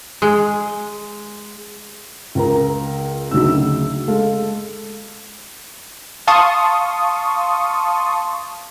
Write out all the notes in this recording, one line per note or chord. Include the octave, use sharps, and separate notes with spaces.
G#3
C#2 A#4 A#5
D2 C#3 F#3 D#4 E6
G#3 A4 F5
F5 A5 C6 C#6 D#6